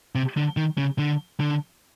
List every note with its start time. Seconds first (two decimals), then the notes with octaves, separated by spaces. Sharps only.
0.15 C3
0.37 D3
0.57 D#3
0.78 C#3
0.99 D3
1.40 D3